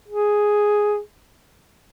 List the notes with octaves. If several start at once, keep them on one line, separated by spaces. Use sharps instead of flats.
G#4